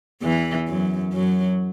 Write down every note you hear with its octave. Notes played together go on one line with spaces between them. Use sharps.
E2 E3
F#2 F#3
F#2 F#3